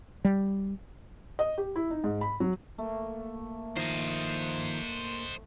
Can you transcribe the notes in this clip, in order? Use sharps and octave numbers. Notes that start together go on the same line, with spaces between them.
G3
D#5
G4
E4
D#4
G#2
B5
F#3
A3 A#3
D#3 F3 C5 D#5